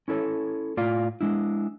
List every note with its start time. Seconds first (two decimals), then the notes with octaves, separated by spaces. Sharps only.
0.08 C#4 E4 A4 C#5
0.77 A2 F4 D5 F5
1.21 G#3 D4 E4